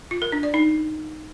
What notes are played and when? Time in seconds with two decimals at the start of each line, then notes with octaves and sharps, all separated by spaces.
0.11 F4
0.22 A#4
0.32 D4
0.43 D5
0.54 D#4